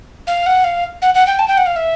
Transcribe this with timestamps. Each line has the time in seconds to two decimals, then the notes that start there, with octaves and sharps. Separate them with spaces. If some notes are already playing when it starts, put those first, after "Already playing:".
0.27 F5
0.46 F#5
0.64 F5
1.02 F#5
1.14 F#5
1.27 G5
1.39 A5
1.48 G5
1.57 F#5
1.66 F5
1.76 E5